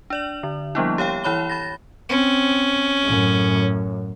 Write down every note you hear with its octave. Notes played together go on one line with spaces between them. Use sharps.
D4 D5 F#7
D3
F3 G3 A#3 B3 D4 E4
G4 C#5 F5 G5
E3 E4 C#5 B5 G7
B5 A6 A#6
C4 C#4
F#2 A2